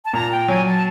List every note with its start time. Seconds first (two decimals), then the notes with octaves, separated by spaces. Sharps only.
0.04 A5
0.13 A#2 A#5
0.31 G5
0.48 F#3 G#5
0.66 A5